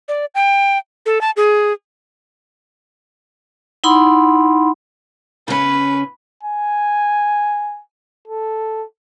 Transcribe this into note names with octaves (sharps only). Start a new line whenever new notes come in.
D5
G5
A4
A5
G#4
D#4 E4 F#5 B5 C6
C#3 C#4 B4
G#5
A4